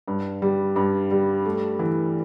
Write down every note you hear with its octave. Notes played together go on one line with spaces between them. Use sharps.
G2
G3
G2
G3
A3
E3